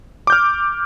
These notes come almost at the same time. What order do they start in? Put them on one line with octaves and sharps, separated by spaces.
D6 G6 F6